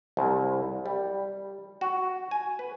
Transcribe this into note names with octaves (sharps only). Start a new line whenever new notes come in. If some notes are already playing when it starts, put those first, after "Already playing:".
C2
G3
F#4
G#5
B4